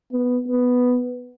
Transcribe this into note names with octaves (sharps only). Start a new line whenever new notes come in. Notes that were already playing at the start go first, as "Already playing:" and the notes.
B3
B3